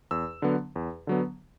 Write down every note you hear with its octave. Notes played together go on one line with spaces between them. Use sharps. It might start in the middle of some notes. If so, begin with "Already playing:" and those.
E2 E6
D3 F#3 B3
E2
D3 F#3 B3